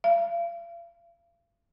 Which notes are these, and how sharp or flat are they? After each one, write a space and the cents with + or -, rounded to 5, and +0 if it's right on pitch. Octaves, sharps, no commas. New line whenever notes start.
F5 -40